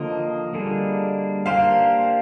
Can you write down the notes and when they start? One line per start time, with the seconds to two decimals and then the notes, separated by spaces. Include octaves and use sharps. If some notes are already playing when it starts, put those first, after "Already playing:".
Already playing: D3 F3 A#3 D#5
0.54 D3 G3 A#3 D4 G#4
1.46 A#3 D4 G4 C5 F5